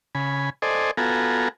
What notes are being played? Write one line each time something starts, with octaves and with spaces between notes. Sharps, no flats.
C#3 G#5 B5
A4 C5 D5 D#5 G#5
B3 F4 F#4 A4 G#5 A#5